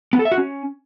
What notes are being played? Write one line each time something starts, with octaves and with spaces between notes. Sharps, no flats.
B3
A4
E5
F#4
C#4